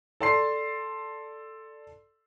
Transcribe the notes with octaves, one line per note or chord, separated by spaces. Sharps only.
A4 D5 A5 C6 C7